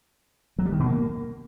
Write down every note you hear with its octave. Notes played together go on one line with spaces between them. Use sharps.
F#3
G3
D#3
B2
A#3